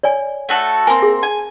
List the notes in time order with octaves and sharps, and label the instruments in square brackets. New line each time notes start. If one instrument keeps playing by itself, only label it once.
[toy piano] C#5 D5 G#5
[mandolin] A3 F#4 A4
[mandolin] A#3 C4 [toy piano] G#5
[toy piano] G#4
[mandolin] G#5